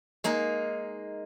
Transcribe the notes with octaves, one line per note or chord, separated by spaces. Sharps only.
G#3 A#3 D#4